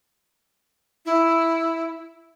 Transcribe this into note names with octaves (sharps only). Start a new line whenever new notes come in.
E4